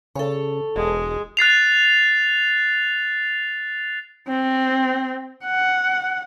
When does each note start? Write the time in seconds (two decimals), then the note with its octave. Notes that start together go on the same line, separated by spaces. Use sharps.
0.15 C#3 A4 C#5
0.76 E1 G#3
1.37 F#6 A6 C7 F7
4.28 C4
5.45 F#5